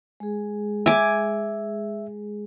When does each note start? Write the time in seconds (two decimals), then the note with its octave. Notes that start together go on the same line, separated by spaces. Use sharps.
0.20 G#3 G#4
0.86 E5 G#5 D6